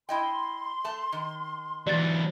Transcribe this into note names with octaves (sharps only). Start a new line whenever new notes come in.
E4 D#5 G5 C6
A3 A5
D#3
E3 F#3 D5 A6